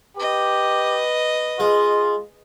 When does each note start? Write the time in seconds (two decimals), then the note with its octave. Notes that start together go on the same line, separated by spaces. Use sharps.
0.17 G4 B4 D#5
1.60 G#3 F4